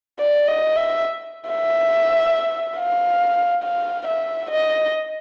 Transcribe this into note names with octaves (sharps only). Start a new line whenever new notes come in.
D5
D#5
E5
E5
F5
F5
E5
D#5